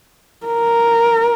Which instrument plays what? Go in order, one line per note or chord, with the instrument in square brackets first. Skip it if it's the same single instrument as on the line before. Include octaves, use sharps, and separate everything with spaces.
[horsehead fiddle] A#4